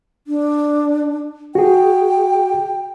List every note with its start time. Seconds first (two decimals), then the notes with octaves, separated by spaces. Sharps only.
0.27 D4
1.55 F#4 G#4 G5